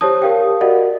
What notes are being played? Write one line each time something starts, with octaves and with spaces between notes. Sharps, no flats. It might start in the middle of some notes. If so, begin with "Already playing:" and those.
G4 C5 C#5 A5 D#6
G4 A#4 F5 G5
F#4 A#4 D5 D#5 F#5